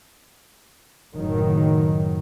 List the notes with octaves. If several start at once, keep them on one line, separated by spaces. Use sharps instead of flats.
F#1 A2 D#3 F#3